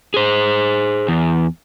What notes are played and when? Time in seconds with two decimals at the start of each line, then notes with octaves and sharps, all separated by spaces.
0.14 G#4 C5
1.08 E2